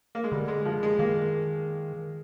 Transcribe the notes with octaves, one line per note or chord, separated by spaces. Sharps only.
A#3
G#3
D3 G3
G#3
F3
G#3
D#3 A#3